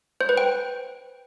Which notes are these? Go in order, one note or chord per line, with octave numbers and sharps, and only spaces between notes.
C5
B4
G5